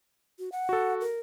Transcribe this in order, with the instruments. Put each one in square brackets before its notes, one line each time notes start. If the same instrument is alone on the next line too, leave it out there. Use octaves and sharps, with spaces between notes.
[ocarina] F#4
F#5
[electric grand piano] F#4 A4
[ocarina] A#4